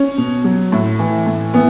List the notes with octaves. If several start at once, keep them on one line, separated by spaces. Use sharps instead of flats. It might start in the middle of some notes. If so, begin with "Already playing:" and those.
Already playing: C#4
B2
F#3
A2
E3
A2
E3 B3